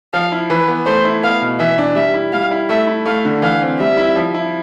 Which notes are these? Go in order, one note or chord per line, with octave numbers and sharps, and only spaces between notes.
F3 F5
E4
E3 B4
B3
A3 C5
E4
B3 F5
B2
E3 E5
D4
G3 E5
E4
G3 F5
E4
A3 E5
E4
A3 F5
D3
E3 F5
C4
G3 E5
E4
F3
E4